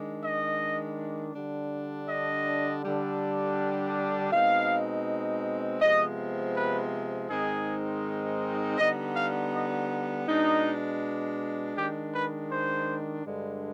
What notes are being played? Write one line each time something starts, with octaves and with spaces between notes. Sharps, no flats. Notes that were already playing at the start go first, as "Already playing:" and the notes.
Already playing: D#3 G#3 D4
D#5
D3 G3 D4
D#5
D3 G3 D4
B2 G#3 C4 D#4 F5
C3 F3 G#3 B3 D#5
B4
G#2 D#3 G#3 C4 D#4 G#4
D3 G3 B3 D#4 D#5
F5
D#5
B2 G#3 D4 D#4
D#3 G#3 D4 G4
B4
C5
G2 D3 G#3